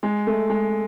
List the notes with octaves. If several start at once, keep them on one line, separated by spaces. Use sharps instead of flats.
G#3
A3
G#3